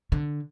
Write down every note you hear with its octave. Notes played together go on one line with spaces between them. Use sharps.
D3